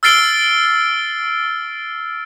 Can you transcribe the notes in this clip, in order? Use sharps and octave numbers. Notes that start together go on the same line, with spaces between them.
E6 F6 A6 C7 D7 G7